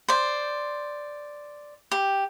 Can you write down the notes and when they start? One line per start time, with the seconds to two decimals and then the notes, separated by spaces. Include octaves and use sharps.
0.08 C5 D5
1.91 G4